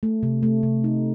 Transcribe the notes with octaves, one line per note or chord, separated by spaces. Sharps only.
A3
C3
A3
C3
D#4